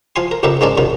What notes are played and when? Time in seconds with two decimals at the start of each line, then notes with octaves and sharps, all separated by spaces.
0.16 F3 F5 G#5 C6
0.31 A#4
0.43 F2 C#3 A#3 G4 B4 E5
0.61 G#2 G#3 A#3 C#4 D4 D5
0.78 F#2 C3 D#3 F4